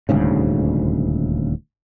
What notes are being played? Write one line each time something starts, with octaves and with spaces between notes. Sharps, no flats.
D#1 D2 G#2 C#3